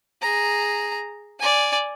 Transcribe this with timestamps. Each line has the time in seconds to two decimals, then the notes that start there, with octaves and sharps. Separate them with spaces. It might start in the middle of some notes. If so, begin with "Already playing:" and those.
0.22 G#4 A#5
1.39 D5 G#5